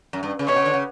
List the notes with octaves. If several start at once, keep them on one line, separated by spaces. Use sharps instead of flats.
F#2
G2
C#3
B2 C#5
C#3
D3
C#3